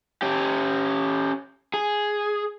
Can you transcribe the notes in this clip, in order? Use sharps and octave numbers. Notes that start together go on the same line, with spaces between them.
C#4 G4
G#4